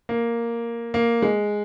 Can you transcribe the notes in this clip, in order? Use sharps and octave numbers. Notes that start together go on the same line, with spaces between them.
A#3
A#3
G#3